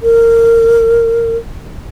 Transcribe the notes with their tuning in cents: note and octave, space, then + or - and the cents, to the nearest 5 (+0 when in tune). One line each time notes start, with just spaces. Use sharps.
A#4 -20